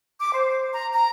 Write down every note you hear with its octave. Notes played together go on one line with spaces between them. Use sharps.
D6
C5
A#5
A#5